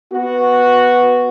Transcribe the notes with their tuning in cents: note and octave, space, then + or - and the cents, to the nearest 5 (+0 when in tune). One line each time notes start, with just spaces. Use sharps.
B3 +0 F#4 -5